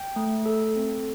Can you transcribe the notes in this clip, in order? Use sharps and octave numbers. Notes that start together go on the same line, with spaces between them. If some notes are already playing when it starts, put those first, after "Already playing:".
Already playing: G5
A3
A4
C4